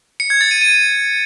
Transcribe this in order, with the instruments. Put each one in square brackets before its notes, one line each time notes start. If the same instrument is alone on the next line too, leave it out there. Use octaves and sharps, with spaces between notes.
[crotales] C#7
G#6
A6
D#7
D#7